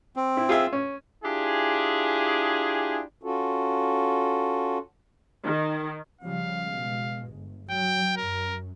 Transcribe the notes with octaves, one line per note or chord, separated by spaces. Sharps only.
C4
E4
F4 G#4 E5
C#4
D4 E4 F4 G4 G#4
C#4 F4 F#4 A4
D#3
C#3 F3 G3 F5
B2 G#3
G1
F#3 G5
F#2 A#4